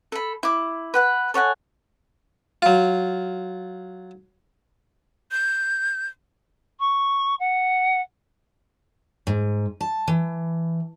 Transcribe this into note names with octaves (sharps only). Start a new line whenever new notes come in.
A4 B5
E4 D6
B4 F#5 B5
A4 C#5 F#5 G#5
F#3 F4
G6
C#6
F#5
G#2
A5
E3